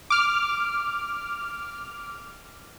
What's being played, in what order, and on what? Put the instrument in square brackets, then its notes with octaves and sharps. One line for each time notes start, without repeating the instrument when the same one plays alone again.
[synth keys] D6 F6